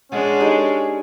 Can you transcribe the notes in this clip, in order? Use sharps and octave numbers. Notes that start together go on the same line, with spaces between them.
G#3 C#4 D4 F#5
D#4 G4 A4 C#5 D5